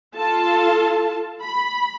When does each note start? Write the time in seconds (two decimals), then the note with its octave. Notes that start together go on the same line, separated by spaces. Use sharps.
0.15 F4 A4 A5
1.43 B5